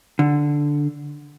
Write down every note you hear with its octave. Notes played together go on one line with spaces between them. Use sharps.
D3